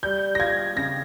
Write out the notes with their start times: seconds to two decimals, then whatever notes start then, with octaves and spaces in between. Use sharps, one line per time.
0.03 G3 G6
0.35 A#6
0.39 F4 G#6
0.76 C#3 A#6